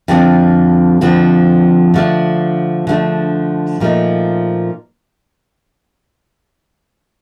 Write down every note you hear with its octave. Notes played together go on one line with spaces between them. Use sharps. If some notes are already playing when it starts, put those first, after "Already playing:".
F2 D3 F3 C4
F2 D3 F3 C4
D3 F3 A3 D4
D3 F3 A3 D4
A#2 F3 A3 D#4